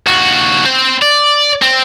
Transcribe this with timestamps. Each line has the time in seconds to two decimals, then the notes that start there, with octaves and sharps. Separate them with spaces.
0.07 D#2 F#4
0.65 C4 C5
1.02 D5
1.62 C4